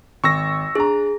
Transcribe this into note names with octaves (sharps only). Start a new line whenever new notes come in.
G#1 C#6 E6 A#6
D4 G#4 A#5